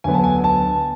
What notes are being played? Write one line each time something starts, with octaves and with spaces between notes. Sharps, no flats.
D2 D3 F#3 B3 G#5
A5
G#5
A5